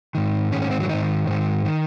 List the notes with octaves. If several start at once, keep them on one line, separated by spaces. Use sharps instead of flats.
G#2 D#3
G#2 D#3 C#4
C#4
C4
F#3
G#2 D#3 D#4
G#2 D#3
D#3